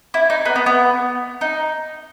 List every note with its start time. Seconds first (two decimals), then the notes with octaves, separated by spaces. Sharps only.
0.14 E4
0.30 D#4
0.45 B3
0.56 B3
0.66 B3
1.41 D#4